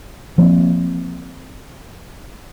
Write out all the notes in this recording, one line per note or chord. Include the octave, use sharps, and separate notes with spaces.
F3 A#3 C4